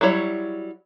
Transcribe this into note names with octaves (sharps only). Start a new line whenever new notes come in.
F#3 G3 E4 C#5